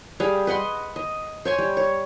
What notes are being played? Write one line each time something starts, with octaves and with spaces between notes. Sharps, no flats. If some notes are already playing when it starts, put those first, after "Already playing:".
G3 G#4 F5
B4 D#5 F#5 C6
D#5
C5 C#5 G#5
G3
C#5